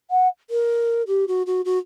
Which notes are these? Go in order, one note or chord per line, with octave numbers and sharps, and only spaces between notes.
F#5
A#4
G4
F#4
F#4
F#4